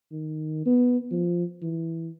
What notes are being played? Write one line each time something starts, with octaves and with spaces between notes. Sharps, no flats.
D#3
B3
F3
E3